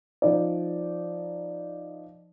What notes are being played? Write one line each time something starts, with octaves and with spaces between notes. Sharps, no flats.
F3 D#4 D5